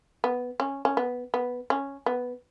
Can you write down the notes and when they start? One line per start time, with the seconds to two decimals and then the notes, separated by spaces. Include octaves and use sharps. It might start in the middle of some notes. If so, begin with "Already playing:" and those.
0.24 B3
0.60 C#4
0.85 C#4
0.97 B3
1.34 B3
1.70 C#4
2.06 B3